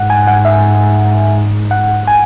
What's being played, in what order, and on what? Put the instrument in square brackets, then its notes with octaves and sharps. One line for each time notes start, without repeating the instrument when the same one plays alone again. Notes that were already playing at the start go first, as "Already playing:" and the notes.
Already playing: [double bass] G#2 [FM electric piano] F#5
[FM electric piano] G#5
F#5
E5
F#5
G#5